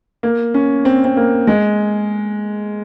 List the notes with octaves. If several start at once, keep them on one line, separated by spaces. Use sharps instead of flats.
A#3
C#4
C4
C4
A#3
G#3